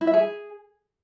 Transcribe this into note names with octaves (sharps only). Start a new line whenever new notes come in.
E4
E5
G#4